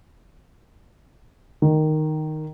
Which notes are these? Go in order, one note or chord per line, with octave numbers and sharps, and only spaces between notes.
D#3